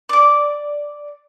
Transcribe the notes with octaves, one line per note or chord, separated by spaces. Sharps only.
D5 D6